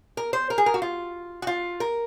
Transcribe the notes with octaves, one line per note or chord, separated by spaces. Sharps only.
A#4
C5
A#4
G#4
A#4
F#4
F4
F#4
F4
A#4